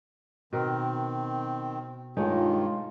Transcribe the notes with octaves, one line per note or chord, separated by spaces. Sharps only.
B2 D#3 C4 A#4
G2 D#3 G#3 A3 D#4 F4 C#5